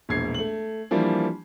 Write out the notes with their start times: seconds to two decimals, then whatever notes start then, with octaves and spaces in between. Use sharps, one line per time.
0.09 E1 A#1 G#6 C7
0.34 A3 F#7
0.91 E3 F3 G3 A#3 D4